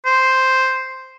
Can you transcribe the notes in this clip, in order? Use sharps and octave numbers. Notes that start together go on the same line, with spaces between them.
C5